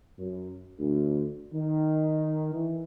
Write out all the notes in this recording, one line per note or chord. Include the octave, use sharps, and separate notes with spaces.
F#2
D2
D#3
E3